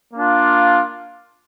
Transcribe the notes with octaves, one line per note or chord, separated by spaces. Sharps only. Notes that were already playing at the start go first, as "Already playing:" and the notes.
A#3 D4 F4